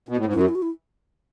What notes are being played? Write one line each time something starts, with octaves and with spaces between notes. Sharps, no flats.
B2
A2
G#2
F#2 E4
F#4
E4
F#4
E4